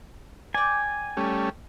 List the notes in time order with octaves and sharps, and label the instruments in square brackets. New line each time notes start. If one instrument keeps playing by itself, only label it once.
[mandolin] D5 G5 [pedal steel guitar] G#5
[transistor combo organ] G3 A3 C#4